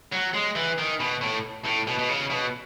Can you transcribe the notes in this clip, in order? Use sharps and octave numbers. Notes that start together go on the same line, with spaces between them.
F#3
G#3
E3
D#3
B2
A2
A2
B2
B2
C#3
B2